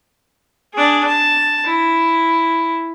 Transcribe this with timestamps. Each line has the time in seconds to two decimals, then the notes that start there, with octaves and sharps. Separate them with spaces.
0.74 D4 G#4
1.07 A5
1.65 E4